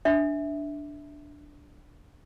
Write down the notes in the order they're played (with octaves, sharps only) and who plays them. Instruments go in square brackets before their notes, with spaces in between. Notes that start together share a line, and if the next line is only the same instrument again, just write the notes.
[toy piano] D4 E5